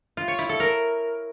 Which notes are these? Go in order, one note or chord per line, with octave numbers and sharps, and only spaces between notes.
F4
C#5
E4
A4
A#4